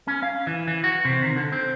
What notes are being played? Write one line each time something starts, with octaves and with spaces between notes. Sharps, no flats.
C#4
F5
E3
E3
F#4
C3
D#3
D3
C4